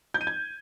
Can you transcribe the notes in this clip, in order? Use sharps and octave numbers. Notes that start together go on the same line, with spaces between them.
G6
D#7
G#6